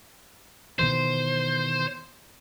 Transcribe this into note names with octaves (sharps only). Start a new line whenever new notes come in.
B2 D#3 E3 C5